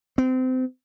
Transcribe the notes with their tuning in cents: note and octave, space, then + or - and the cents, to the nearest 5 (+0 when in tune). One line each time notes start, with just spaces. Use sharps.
C4 -30